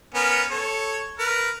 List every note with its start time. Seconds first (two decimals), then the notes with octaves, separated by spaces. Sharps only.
0.14 B3 C#4 A#4
0.51 A4 C#5
1.19 A#4 B4